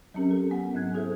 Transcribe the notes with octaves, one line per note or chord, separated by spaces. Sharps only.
F#3 C4 C#4 G4 A#4
A4 A#4
B3 F#5
G#2 F#3 C4 E4 F#6 G#6
F#4 G#4 A4 C5 E5